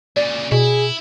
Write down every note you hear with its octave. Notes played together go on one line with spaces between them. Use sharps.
A#2 C#3 D5
B2 E4 G#4